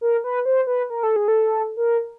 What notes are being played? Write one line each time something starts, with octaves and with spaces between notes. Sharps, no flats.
A#4
B4
C5
B4
A#4
A4
G#4
A4
A#4